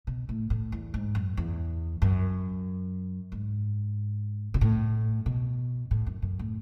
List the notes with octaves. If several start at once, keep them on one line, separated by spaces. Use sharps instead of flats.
B2
A2
A2
E2
G#2
F#2
E2
F#2
G#2
B2
A2
B2
A2
F#2
F#2
A2